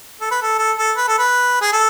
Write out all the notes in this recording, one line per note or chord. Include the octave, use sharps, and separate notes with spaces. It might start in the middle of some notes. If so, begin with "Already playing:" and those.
A4
B4
A4
A4
A4
B4
A4
B4
G#4
A4